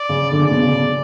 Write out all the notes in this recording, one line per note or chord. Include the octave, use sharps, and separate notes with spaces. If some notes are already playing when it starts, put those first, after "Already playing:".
Already playing: D5
C#3
D3 D5
C#3
B2
C#3